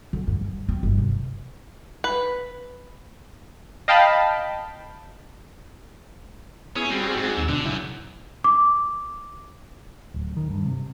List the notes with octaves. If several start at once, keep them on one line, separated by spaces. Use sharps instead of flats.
D3
G2
G2
C4
G1
C3
B4
D#5 F5 G5 A5 B5
B3 C#4 E4 G#4
G3 C4 F#4 G#4
G#2
D#2 E6
B2 D3 D4
F#2 C#3 E4 E6
D6
D1
D#3
G2
C3